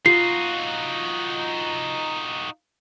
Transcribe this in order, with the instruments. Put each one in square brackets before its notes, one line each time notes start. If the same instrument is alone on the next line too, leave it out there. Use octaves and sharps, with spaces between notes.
[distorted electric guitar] D#4 F#4 [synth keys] F4 [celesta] C7